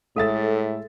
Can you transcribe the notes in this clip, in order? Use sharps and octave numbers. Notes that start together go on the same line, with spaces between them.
A2 G#3 A4 E5 A6